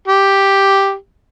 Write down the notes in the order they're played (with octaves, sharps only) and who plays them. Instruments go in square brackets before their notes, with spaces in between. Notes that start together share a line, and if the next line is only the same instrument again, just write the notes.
[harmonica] G4